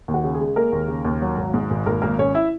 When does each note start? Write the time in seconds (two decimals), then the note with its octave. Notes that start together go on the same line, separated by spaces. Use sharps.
0.08 D#2
0.14 F#4
0.24 C#3
0.34 G#4
0.40 G#3
0.56 G#3 A#3 A#4
0.72 D#2
0.88 C#3
1.05 D#2
1.22 F#3
1.37 G#1
1.54 G#2
1.70 G#1
1.86 G#1 A#3 A#4
2.02 G#1 A#3 A#4
2.18 G#1 C#4 C#5
2.35 E4 E5